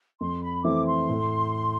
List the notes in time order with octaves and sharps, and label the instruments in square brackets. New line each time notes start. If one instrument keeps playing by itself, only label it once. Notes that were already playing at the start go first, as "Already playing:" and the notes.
[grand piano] F2 [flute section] C6
[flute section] B5
[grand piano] E3 A3 C4 E4 [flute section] D6
[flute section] C6
[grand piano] A2